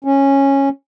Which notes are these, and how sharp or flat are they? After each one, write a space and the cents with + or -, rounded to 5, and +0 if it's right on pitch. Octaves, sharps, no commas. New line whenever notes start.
C#4 -10